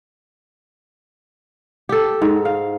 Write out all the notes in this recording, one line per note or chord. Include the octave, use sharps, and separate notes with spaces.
G4 A4
G#2
F5